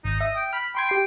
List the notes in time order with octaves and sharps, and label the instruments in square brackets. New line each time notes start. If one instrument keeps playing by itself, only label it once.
[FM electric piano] G#1 [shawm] D#4
[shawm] D#5 [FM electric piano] E5
[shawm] G5
[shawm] B5 [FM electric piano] F6
[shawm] G5 [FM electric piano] B5 C6 G#6
[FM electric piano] G4 C7